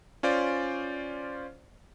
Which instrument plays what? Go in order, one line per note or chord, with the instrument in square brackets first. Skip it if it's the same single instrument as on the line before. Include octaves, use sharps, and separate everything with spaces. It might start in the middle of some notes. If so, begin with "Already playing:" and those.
[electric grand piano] C#4 F4 C5 D5